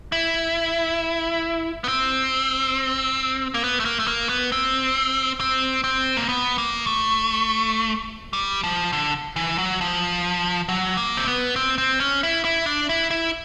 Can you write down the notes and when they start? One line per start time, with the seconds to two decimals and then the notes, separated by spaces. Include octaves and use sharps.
0.12 E4
1.84 B3
1.88 C4
3.54 A#3
3.64 B3
3.80 A3
3.85 A#3
3.99 A3
4.07 A#3
4.29 B3
4.52 C4
5.40 C4
5.84 C4
6.17 A#3
6.29 B3
6.58 A#3
6.86 A3
8.33 G3
8.64 F3
8.93 D3
9.36 E3
9.58 F#3
9.81 F3
10.69 F#3
10.97 A#3
11.17 C4
11.28 B3
11.56 C4
11.78 C4
12.00 C#4
12.23 E4
12.45 E4
12.66 D4
12.89 E4
13.11 E4